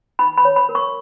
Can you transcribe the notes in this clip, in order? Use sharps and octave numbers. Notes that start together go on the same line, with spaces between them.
D#4 B5
B5
C#5
B5
A#4
C#6